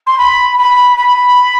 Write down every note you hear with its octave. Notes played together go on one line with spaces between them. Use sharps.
C6
B5
B5
B5